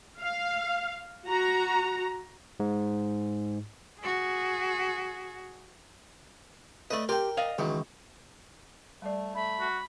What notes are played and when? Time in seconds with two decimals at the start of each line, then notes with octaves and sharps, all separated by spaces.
0.20 F5
1.27 F#4 A#5
2.60 G#2
4.00 F#4 G#4
6.90 A3 B4 D5 D#5
7.09 G4 A#4 G5 C6
7.37 D5 D#5 F5
7.59 C#2 D#3 E3 F#3
9.02 G3 A3 D5
9.35 A3 E5 B5
9.60 F#4